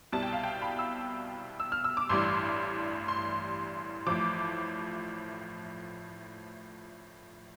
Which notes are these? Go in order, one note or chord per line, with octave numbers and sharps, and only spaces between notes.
C2 B2 G3 A5
G5
F5
G5
B5
E6
E6
F6
E6
D6
A1 G2 E3 G3 C6
C6
A1 A2 F3 D6